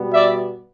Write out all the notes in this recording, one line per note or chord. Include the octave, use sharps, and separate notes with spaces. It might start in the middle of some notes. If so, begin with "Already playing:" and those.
Already playing: B2 G3 B3
D5 E5